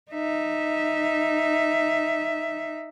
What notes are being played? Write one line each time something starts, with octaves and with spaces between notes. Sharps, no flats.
D#4 E5